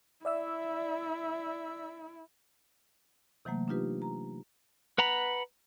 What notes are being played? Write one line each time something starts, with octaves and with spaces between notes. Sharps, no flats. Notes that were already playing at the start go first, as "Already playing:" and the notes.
E4 D5 E5 E6
C3 E3 F#3 A3 A#3
D4 D#4 F4 G4 B4
A#5
B4 F#5 A#5 B5